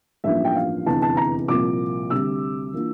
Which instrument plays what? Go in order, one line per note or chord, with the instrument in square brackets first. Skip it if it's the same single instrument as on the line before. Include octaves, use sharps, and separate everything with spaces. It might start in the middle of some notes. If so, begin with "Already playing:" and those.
[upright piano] A1 G2 F3 A#3 E5
G5
F5
F1 E2 D3 A5
A5
A#5
C2 A#2 F3 A#3 D6
D2 C3 G3 E6
E3 A#3 D4 F4